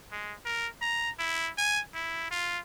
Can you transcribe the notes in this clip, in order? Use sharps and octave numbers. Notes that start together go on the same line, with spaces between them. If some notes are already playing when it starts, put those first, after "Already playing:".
G#3
A#4
A#5
E4
G#5
E4
F4